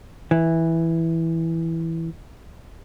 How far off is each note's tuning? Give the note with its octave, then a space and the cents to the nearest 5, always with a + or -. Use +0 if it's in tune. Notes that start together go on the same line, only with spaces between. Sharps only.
E3 -5